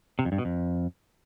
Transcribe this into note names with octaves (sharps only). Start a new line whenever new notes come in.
C3
F2
G2
B2
F2